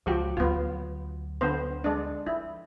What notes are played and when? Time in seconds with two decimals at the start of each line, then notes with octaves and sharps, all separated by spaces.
0.06 C#2 F3 F#4 G4
0.37 D2 F#3 B3 F4
1.41 D3 B3 C5
1.84 G#3 D4
2.27 F3 E4